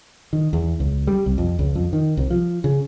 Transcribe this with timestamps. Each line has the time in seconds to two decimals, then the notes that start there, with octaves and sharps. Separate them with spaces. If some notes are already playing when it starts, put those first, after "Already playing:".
0.33 D#3
0.53 E2
0.80 C#2
1.07 G3
1.26 C2
1.38 F2
1.59 C#2
1.75 F2
1.93 D#3
2.17 C2
2.30 F3
2.64 C#3